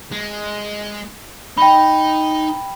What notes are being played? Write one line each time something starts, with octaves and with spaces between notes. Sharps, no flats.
G#3
D#4 G5 B5